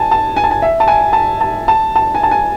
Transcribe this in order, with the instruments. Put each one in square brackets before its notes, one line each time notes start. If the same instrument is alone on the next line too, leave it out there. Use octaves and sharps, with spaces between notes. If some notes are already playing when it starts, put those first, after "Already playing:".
Already playing: [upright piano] G#5 A5
A5
G#5
A5
G#5
E5
A5
G#5
A5
A5
A5
A5
G#5
A5
G#5